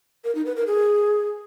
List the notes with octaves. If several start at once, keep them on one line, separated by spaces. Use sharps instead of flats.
A#4
D#4
B4
A#4
G#4